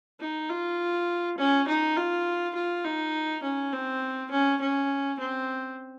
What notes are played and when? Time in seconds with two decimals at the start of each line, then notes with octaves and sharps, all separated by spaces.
0.20 D#4
0.50 F4
1.38 C#4
1.67 D#4
1.97 F4
2.55 F4
2.85 D#4
3.43 C#4
3.73 C4
4.31 C#4
4.61 C#4
5.19 C4